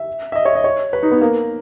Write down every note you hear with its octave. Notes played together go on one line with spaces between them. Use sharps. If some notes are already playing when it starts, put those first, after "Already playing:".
Already playing: E5
E5
D#5
C#5
D#5
C#5
B4
D#4
B3
A#3